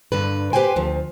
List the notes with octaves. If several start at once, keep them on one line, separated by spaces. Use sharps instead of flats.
G2 D3 B4
G4 B4 C5 G5 G#5
D2 F3